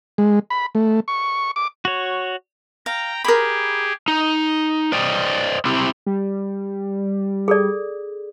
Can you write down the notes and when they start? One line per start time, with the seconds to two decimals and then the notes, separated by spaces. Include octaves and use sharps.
0.18 G#3
0.50 B5
0.75 A3
1.08 C#6
1.56 D6
1.85 F#4 C#5
2.86 F5 G5 A#5
3.24 G4 G#4 A#4 B5
4.08 D#4
4.92 C5 D5 D#5 G5
5.65 C4 E4 G4
6.06 G3
7.48 G#4 A4 D5